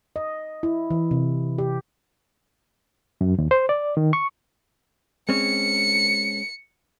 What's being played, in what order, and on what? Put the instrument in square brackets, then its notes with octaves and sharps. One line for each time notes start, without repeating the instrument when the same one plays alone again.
[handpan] D#5
E4
E3
C3
G4
[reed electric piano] F#2
D#2
C5
D5
D#3
C#6
[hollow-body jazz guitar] G#3 C4 C#4 [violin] C#7